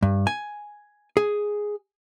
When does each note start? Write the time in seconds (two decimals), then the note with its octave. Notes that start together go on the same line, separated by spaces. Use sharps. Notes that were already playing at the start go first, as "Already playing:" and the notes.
0.03 G2
0.27 G#5
1.17 G#4